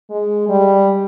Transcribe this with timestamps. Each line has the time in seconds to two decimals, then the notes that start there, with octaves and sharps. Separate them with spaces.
0.10 G#3
0.49 G3